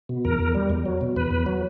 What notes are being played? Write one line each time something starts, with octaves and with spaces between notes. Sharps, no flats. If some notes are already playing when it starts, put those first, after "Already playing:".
B2
E2 A#4
E2
G3
E2
F#3
B2
E2 B4
E2
F#3